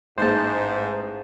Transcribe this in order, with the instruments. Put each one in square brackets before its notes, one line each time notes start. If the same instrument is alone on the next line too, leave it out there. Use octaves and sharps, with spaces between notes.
[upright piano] A1 G#3 [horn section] G#2 [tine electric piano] C5 A5